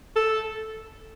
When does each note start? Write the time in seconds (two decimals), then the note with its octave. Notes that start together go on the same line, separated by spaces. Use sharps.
0.16 A4